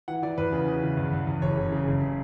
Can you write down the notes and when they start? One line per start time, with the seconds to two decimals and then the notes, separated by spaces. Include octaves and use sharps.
0.08 E3 F#5
0.23 E3 D5
0.38 E2 B4
0.53 C#3
0.68 C#3
0.83 E3
0.97 E2
1.13 E2
1.27 E2
1.42 F#1 C#5
1.57 F#1
1.72 C#3
1.87 F#1
2.02 C#3